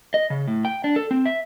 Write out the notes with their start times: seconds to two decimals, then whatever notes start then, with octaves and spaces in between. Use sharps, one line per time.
0.14 D#5
0.30 C#3
0.48 A2
0.65 G5
0.84 D4
0.96 A4
1.11 C4
1.26 E5